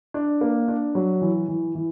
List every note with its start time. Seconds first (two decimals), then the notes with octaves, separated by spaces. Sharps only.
0.14 D4
0.41 A#3
0.68 D4
0.95 F#3
1.22 E3
1.49 E3
1.75 E3